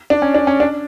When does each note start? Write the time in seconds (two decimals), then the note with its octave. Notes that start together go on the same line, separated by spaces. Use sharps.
0.10 D4
0.22 C#4
0.35 D4
0.47 C#4
0.60 D4